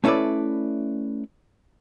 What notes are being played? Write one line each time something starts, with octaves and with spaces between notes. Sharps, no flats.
A3 C#4 E4 A4 B4 D5